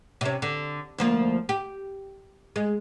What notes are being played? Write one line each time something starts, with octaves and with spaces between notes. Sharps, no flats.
C3 C#4
D3
D2 F3 A#3
G4
G#3